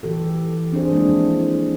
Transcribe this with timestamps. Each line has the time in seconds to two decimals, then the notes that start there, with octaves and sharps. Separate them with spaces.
0.03 E3 G4 A4
0.72 C4 D4 G#4 C5
0.92 F3 G#3 A#3 D4 E4